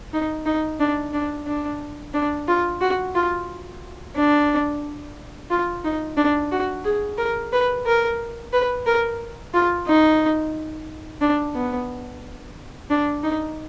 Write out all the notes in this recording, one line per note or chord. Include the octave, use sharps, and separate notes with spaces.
D#4
D#4
D4
D4
D4
D4
F4
F#4
F4
D4
F4
D#4
D4
F#4
G#4
A#4
B4
A#4
B4
A#4
F4
D#4
D4
B3
D4
D#4